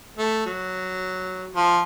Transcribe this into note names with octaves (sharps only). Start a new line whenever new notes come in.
A3
F#3
F3